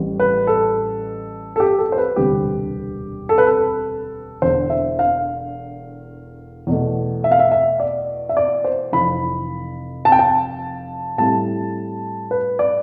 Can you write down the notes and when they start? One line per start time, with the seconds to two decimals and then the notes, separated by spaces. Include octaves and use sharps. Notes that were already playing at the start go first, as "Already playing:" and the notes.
Already playing: A1 A2 G3
0.20 B4
0.47 A4
1.56 A4
1.60 G4
1.79 A4
1.92 C5
1.98 B4
2.16 E1 D2 C3 G3 B3 G4
3.29 A4
3.38 B4
3.47 A4
4.42 E1 E2 D3 C5
4.70 E5
4.99 F5
6.67 E2 B2 A3
7.24 E5
7.31 F5
7.39 E5
7.51 E5
7.80 D5
8.29 E5
8.37 D5
8.64 C5
8.93 F1 F2 E3 B5
10.05 A5
10.12 G5
10.19 A5
11.18 A2 G3 C4 E4 A5
12.31 B4
12.59 D5